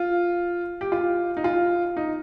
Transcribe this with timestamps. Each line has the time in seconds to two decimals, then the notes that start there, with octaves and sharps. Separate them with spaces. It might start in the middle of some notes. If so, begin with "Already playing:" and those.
Already playing: F4
0.81 G4
0.92 F4
1.37 D#4
1.44 F4
1.97 D#4